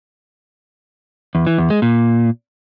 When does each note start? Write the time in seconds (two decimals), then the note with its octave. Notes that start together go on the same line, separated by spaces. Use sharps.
1.35 E2
1.47 E3
1.58 E2
1.70 G#3
1.82 A#2